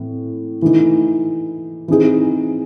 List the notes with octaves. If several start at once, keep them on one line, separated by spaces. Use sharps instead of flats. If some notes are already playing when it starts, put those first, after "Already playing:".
Already playing: A2 E3 C4
E3 A3 D#4
E3 C4 D#4 G#4